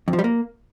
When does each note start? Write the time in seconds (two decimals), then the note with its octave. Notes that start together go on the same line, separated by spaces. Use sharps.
0.08 F2
0.13 F3
0.19 G3
0.24 A#3